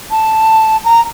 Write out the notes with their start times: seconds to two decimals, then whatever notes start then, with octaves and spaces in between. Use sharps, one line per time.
0.11 A5
0.85 A#5